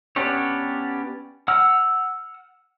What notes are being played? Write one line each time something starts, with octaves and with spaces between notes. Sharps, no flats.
B3 C#4 D4 G4 C#5
F#5 E6 F6